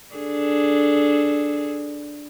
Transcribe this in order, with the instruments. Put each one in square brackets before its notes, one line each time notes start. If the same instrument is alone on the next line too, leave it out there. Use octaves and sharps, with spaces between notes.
[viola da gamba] D4 G#4 A4